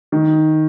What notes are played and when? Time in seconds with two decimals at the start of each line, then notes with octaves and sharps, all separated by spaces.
0.12 D#3